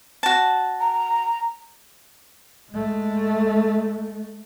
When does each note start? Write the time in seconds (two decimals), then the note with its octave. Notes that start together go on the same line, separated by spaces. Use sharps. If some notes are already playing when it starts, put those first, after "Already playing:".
0.23 F#4 A5
0.81 A#5
2.71 G#3 A3